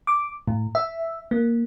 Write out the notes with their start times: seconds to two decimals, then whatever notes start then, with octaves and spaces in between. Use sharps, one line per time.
0.07 D6
0.48 A2
0.75 E5
1.31 A#3